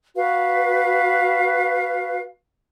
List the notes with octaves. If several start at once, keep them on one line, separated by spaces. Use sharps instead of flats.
F#4 B4 F5